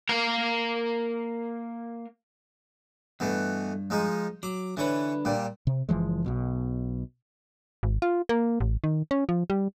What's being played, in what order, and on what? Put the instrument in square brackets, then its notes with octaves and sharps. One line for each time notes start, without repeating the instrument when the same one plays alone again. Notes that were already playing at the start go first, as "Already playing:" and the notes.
[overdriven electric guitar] A#3 A#4
[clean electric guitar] G2 [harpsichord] B2 E3 A3
[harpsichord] F3 G#3 D#4
[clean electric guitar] F#3 [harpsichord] D6
[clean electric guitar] D3 D4 B4 [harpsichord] E3 C#5
[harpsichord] A#2 G3
[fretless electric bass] C3
F#1 E3 F3 G#3
B1 B2
[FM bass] G#1
F4
A#3
A1
D#3
C#4
F3
G3